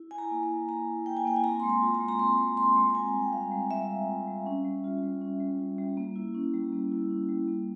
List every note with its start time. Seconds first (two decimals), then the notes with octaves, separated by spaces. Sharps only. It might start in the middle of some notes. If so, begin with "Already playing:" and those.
Already playing: E4
0.11 E4 G#5
0.18 A#5
0.31 A#3
0.43 A#5
0.49 A#3
0.68 E4 A#5
0.88 E4
1.06 A#3 G5
1.17 G#5
1.25 A#3 G5
1.36 G#5
1.44 C4 A#5
1.60 G#3 C6
1.70 A#5
1.82 F4
1.95 A#5
2.01 G#3
2.08 A#5
2.19 C4 C6
2.38 G#3
2.57 F4 C6
2.76 G#3
2.90 A#5
2.95 C4 G#5
3.14 G3
3.22 G5
3.33 F4 F5
3.52 G3
3.71 C4 E5
3.90 G3
4.08 F4
4.27 G3
4.46 C#4
4.65 G3
4.84 F4
5.03 G3
5.21 C#4
5.40 G3
5.59 F4
5.78 G3
5.97 A#3
6.16 E4
6.34 C#4
6.54 G3
6.72 A#3
6.92 E4
7.10 C#4
7.29 G3
7.48 A#3